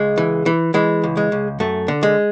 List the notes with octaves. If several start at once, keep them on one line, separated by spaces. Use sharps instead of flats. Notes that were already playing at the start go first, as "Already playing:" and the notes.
Already playing: C#2 G#3
E3
E3
E3 G#3
C#2
G#3
C#2
F#2 A3
D3
G#3